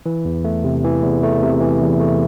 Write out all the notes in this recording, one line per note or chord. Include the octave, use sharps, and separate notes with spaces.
E3
E2
A3
C3
E3
E2
A3
C3
E3
E2
A3